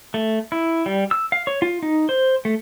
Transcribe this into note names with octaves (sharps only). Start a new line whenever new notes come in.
A3
E4
G3
E6
F5
C#5
F4
D#4
C5
A3